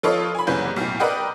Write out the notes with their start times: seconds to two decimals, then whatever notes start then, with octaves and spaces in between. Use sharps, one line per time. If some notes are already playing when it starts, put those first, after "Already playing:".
0.03 F3 F4 A4 B4 C#5 D#5
0.35 G#5 B5
0.47 F#1 C2 E3 C#4 B4 G6
0.76 B1 A2
1.00 A#4 B4 D5 D#5 F#5 G5